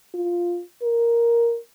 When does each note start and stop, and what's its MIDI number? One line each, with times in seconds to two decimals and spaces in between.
0.14 0.61 65
0.83 1.58 70